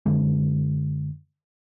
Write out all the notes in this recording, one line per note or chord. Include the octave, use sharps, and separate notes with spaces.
F#2 D3 G#3